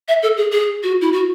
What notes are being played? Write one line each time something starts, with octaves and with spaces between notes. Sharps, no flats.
E5
A4
G#4
G#4
F#4
E4
F#4